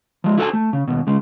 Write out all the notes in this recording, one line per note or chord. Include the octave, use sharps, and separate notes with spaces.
F3 G#3
E4 F#4 A4 C5 G#5
A3
C#3
D#2 B2
C#3 G#3